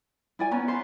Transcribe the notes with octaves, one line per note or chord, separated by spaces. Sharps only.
E4 D5 G#5
B3 C#4 A#5
B4 C5 C6